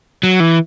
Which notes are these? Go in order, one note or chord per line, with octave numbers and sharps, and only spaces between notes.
F#3
E3